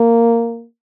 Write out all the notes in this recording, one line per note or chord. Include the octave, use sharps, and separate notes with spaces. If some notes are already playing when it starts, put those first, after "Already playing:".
Already playing: A#3